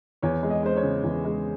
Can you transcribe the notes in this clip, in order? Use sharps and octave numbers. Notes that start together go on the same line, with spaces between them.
E2 C#5
G#3
D#5
G#3 C5
C#5
C#3
E2
G#3